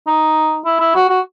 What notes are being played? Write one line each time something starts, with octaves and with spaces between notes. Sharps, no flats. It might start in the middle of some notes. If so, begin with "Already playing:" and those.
D#4
E4
E4
F#4
F#4